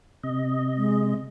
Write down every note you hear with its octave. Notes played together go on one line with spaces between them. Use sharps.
C3 D#5
G#3